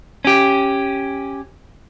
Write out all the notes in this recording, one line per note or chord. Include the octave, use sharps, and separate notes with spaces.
C#4 G4